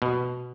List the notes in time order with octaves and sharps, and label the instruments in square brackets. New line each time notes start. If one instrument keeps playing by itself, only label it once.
[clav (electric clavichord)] B2